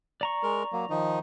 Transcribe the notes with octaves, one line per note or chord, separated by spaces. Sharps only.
D5 A#5 C#6
G#3 A#4
F#3 A#3
D#3 F3 D#4